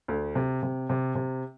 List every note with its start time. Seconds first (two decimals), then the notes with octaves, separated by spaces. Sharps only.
0.08 D2
0.35 C3
0.63 C3
0.90 C3
1.15 C3